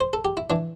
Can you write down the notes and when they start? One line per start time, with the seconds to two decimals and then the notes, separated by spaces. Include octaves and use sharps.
0.01 C5
0.13 A4
0.25 G4
0.37 E4
0.50 E3 D4